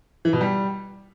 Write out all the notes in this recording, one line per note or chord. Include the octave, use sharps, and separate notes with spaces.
E3
B2
G3